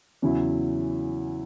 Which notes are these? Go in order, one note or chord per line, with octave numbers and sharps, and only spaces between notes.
E2 C#3 F#3 C#4 E4